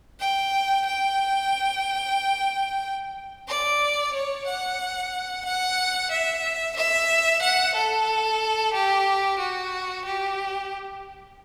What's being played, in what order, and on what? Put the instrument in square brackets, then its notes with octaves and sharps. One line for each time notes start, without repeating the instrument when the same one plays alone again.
[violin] G5
G5
D5
C#5
F#5
F#5
E5
E5
F#5
A4
G4
F#4
G4